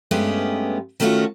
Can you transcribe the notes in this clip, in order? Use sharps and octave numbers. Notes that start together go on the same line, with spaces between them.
G2 G#3 A3 B3 C#4 G4
D#3 A3 C#4 D4 F4 F#4